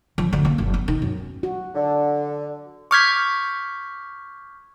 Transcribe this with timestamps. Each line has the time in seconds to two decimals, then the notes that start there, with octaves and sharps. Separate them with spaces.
0.18 F3
0.33 D2
0.45 A#3
0.58 F#1
0.74 B3
0.88 D#3
1.02 F#2
1.43 F#4
1.75 D3
2.91 C#6 D6 F6 G6 G#6 B6